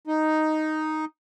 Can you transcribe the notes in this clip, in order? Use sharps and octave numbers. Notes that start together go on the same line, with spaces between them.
D#4